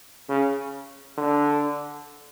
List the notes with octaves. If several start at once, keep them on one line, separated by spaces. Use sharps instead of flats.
C#3
D3